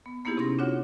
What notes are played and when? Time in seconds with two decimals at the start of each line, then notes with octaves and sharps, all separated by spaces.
0.06 B3
0.25 A#3 B3 D#4 E4 G4 G#4
0.37 C3 C#4 D#4 C6 A#6
0.59 D4 F4 F#4 C#5 F#5